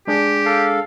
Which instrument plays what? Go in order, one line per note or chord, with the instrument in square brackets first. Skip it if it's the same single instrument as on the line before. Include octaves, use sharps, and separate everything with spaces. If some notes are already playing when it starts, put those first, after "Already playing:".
[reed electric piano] G#3 D4 G#4 [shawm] G4
[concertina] A4 F5